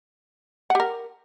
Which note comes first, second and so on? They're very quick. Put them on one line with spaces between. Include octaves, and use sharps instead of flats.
F#5 G4 A#4